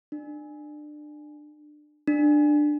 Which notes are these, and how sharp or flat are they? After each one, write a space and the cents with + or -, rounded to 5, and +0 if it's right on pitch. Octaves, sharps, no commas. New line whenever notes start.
D4 +25
D4 +15